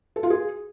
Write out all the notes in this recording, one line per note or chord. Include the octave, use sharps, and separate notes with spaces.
A4
F4
G#4